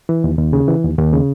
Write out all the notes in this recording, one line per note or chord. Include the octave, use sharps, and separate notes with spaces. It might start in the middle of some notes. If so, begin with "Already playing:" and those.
E3
D#2
D#2
C#3
E3
D#2
D#2
C#3